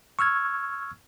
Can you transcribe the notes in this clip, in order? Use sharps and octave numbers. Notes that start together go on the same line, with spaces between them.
C#6 E6 F6 G#6